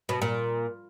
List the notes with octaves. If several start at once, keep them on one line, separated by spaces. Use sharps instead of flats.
B2
A#2